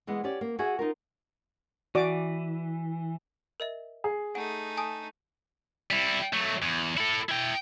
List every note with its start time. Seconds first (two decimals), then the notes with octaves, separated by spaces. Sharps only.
0.07 E3 G#3 B3
0.24 C#4 G4 D5
0.41 A#3
0.59 F#4 G#4 E5 F#5 G#5
0.79 D#4 F4 A#4
1.95 E3 F#4 D5 D6
3.60 A#4 D#5 E5
4.04 G#4
4.35 A3 D#4 F#5 G#5
4.77 G#5 A5 D#6
5.91 G3 E4
6.33 F#3 A3
6.62 E2
6.97 E4 A4
7.29 E4 G5